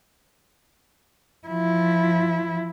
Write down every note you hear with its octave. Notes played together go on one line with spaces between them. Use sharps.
F3 E4